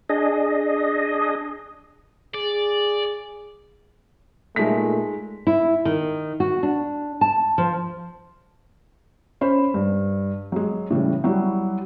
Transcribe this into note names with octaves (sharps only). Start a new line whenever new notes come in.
D4 G#4 D#5
G#4 D5
A#2 G#3 A3 D#4 B6
E4
D#3
F#4
D4
A5
F3
C#4 C5 B5
G2
F#3 G#3
A2 C#3 E3 G3
F#3 G3 E4 F#4